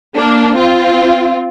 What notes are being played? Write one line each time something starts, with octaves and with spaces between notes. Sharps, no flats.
A#3 D4
C4 F4